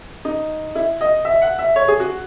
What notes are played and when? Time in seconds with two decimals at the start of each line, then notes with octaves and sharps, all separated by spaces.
0.25 D#4
0.75 E4
1.01 D#5
1.25 E5
1.42 F#5
1.59 E5
1.76 C#5
1.88 G#4
2.00 F#4